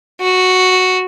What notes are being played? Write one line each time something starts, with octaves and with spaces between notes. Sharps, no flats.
F#4